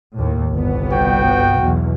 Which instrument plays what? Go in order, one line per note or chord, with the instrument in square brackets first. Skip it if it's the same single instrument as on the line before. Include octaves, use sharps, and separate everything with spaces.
[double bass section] D#2 A2
G1 C2 B3
[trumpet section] F#4 G5
[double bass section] B1 E2 B2